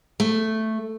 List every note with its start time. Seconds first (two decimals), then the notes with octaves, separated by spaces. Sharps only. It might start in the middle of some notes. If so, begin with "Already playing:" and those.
0.20 A3